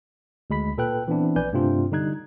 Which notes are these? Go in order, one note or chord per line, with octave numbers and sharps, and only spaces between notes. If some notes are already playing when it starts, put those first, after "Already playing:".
D2 G#3 B5 B6
A#2 A4 B4 G5 F#6
E3 B3 C4 D4 E4
A#1 B4 D5 G#5 G6
G2 C3 A3 C4 D4 F4
D3 G3 D#4 F#6 G#6